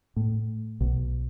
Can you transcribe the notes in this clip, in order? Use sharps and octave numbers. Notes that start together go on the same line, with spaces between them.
A2
B1